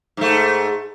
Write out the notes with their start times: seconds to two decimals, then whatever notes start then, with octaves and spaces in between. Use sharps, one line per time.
0.17 G#2 A3